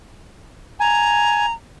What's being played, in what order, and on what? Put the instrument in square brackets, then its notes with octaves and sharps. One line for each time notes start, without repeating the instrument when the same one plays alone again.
[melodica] G#5 [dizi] A#5